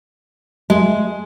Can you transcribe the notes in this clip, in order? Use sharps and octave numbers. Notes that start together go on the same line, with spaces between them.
G#3